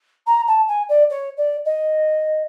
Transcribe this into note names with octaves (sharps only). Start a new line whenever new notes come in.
A#5
A5
G#5
D5
C#5
D5
D#5